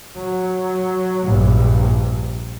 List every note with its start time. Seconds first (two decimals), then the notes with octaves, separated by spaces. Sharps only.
0.16 F#3
1.26 A#1 G2